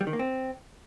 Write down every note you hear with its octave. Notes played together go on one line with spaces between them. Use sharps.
G3
D#3
A#3
C4